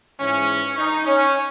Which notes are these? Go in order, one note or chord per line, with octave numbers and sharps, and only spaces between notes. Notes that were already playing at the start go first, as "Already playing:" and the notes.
G#2 E3 G#3 C#4
D#4
C#4